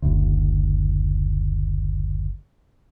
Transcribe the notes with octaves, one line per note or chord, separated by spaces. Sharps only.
F#1 D2